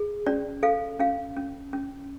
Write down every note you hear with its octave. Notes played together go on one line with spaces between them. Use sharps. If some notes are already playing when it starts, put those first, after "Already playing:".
Already playing: G#4
C#4 D5
A4 F5
C#4 F5
C#4
C#4